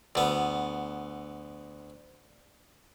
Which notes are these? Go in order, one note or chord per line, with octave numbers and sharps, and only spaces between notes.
D2 B3